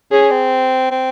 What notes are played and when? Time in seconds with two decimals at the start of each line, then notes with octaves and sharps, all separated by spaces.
0.12 C#4 G#4
0.31 C4
0.91 C4